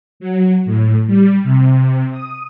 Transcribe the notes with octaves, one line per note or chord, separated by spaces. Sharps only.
F#3
A2
G3
C3
D#6